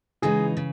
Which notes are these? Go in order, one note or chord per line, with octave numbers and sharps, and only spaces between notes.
C#3 E3 G#3 D#4 G#4
C#3